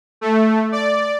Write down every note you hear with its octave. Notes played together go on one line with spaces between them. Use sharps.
A3
D5